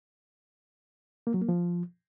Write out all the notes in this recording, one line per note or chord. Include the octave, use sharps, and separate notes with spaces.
A#3
F#3
A#3
F3